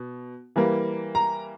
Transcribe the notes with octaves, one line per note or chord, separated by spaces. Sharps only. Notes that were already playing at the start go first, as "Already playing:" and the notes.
Already playing: B2
E3 G3 A#3
A#5